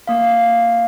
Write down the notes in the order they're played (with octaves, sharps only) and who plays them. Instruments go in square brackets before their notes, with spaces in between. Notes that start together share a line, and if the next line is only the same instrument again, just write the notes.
[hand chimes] A#3 F5